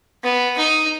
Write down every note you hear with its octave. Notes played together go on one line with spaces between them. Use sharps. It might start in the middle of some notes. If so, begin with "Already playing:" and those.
B3
D#4